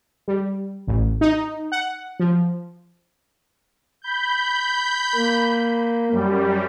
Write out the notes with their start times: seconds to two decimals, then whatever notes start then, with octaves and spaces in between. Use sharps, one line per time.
0.28 G3
0.87 A1
1.21 D#4
1.72 F#5
2.20 F3
4.02 B5 G6
5.15 A#3
6.12 F#2 G3